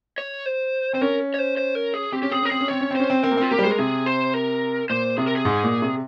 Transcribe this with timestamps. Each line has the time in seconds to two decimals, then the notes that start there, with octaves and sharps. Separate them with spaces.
0.18 C#5
0.46 C5
0.93 C4 C5
1.01 C#4 A#4
1.34 C#5
1.39 C5
1.57 C5
1.75 A#4
1.94 G#4
2.12 C4 G4
2.22 C#4 G4
2.31 C4 G#4
2.42 C#4 A#4
2.50 C4 G#4
2.61 C#4
2.68 C4 C#5
2.81 C#4
2.91 C4
2.96 C#4 C5
3.10 C4
3.23 C4 A#4
3.31 A#3
3.37 C4 F4
3.51 A#3 G4
3.59 G3
3.63 G#3 C5
3.71 A#4
3.78 C3 G#4
4.06 C5
4.34 A#4
4.90 A#2 C5
5.17 C3 G#4
5.27 A#4
5.36 G#4
5.45 G#2
5.64 A#2
5.82 C3